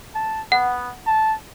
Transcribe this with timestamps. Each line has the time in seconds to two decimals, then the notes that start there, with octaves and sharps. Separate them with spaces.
0.15 A5
0.52 B3 F#5
1.06 A5